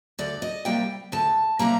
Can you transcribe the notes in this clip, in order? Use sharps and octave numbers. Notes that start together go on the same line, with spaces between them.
D2 D5
D#5
C3 G3 A#3 G5
D2 A5
C3 G3 A#3 A#5